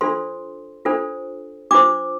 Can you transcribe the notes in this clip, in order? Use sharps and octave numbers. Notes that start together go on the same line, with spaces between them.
D4 F4 A4 C5 C6
D4 F4 A4 C5
D4 F4 C5 D6